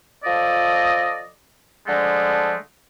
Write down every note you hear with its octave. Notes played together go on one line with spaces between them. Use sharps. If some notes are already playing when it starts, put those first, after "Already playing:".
F3 A4 D5 D#5
D3 F3 G#3 A3